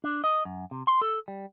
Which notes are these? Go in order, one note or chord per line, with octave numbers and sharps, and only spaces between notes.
D4
D#5
F#2
C3
C6
A4
G3